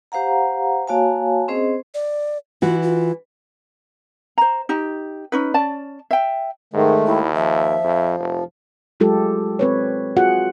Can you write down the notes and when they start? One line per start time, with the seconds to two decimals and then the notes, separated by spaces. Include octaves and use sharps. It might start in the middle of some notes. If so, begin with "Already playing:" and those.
0.12 G4 C5 F5 F#5 A#5
0.87 A#3 F#4 C#5 F5 G#5 A5
1.48 C4 C#4 G#4 C5 D#5
1.94 D5
2.62 E3 F4 F#4
2.83 F4
4.38 C5 A#5
4.69 D#4 G4
5.32 C#4 D#4 B4
5.54 C#4 D5 A5
6.11 E5 G5
6.74 G#2 D#3 G#3 A3
7.06 D#2 E4
7.35 F3 E5
7.84 F2
8.20 F1
9.00 F#3 G#3 F4 G4 A4
9.59 C4 B4 C#5
10.16 F4 F#4 G#4 F#5